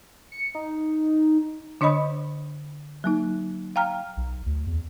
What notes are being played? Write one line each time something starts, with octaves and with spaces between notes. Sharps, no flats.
C#7
D#4
D3 D4 C#5 D#5 B5 D#6
F#3 A#3 D#4
F5 G5 A#5 F6
B1
D2
E2